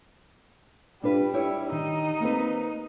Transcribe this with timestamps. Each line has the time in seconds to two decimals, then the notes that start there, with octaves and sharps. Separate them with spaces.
1.03 G3 D4 F4 B4
1.34 E4 G4 C#5
1.72 D#3 D#4
2.20 A#3 C4 B4